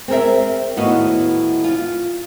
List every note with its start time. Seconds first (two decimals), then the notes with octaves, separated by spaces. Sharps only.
0.08 C4 G#4 A#4 E5
0.77 D#2 A2 B3 F#4 D#5 F5
1.64 F4